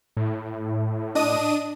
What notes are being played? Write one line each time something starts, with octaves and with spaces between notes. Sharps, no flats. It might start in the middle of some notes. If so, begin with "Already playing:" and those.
A2
D4 D#5 D#6 D#7